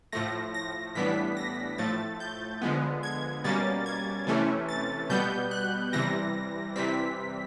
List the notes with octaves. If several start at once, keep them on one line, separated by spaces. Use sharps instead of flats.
A2 F3 A3 A#6
A#6
A2 E3 G3 B3 D4 B6
A#6
A2 F3 A3 A6
G6
D3 F3 G#3 B3
G#6
B2 G3 A#3 C#4 A6
G#6
C3 E3 A3 C#4
A6
B2 G3 B3 G6
F#6
C3 E3 G3 A#6
C3 E3 G3 C4 B6